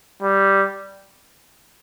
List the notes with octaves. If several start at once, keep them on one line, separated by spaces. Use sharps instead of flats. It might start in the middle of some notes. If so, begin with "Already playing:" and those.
G3